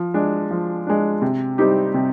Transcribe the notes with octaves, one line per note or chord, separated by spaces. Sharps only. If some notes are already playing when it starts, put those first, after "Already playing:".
Already playing: F3
G#3 D4
F3
G#3 D4
C3
G3 C4 D#4 G4
C3